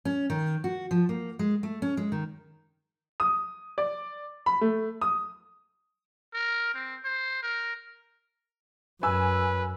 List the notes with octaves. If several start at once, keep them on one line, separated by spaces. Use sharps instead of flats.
C#4
D#3
F#4
F3
A#3
G#3
A3
C#4
G#3
D#3
D#6
D5
B5
A3
D#6
A#4
C4
C5
A#4
F#2 B4 G#5 E6